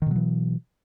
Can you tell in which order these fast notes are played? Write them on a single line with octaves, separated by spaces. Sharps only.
D#3 B2 F#3 E3